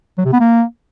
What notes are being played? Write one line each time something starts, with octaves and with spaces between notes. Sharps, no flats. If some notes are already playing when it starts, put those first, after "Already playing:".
F#3
C3
B3
A#3